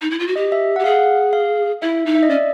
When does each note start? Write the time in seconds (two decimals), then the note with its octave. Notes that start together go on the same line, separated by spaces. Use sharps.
0.01 D#4
0.11 E4
0.19 F4
0.27 F#4
0.36 G4 D#5
0.52 E5
0.76 F#5
0.79 G4
0.84 G#4 F5
0.92 F#5
1.33 F5
1.82 E4 E5
2.06 D#4
2.15 E5
2.23 D#5
2.30 C#4 D5